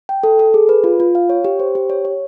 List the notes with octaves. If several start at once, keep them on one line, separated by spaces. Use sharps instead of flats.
G5
A4
A4
G#4
B4
F4
F4
F5
C#5
G4
C5
G4
C#5
C#5